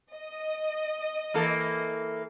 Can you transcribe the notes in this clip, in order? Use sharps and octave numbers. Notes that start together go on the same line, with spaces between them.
D#5
E3 A#3 A4